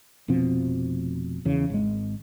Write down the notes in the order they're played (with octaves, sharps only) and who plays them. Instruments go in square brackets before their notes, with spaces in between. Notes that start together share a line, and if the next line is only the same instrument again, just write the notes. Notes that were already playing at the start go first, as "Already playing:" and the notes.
[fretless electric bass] F1 B2 F3 C4
E2 C#3
G#1 G#3